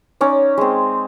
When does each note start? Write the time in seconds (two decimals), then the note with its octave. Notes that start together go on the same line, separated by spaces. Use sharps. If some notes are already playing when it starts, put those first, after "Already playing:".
0.21 C#4 D#4 D5
0.58 G#3 C4